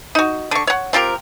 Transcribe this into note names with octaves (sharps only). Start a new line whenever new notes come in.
D#4 F#4
D3 C#6
C#5 F#5
C4 F4 G4 A#4